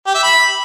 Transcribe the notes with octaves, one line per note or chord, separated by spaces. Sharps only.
G4
E5
B5